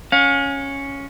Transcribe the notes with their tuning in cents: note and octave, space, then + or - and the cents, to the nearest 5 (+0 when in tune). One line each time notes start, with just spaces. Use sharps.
C#4 +0 F5 +35